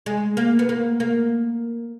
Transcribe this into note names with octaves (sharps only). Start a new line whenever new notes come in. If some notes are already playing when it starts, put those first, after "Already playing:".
G#3
A#3
B3
A#3
A#3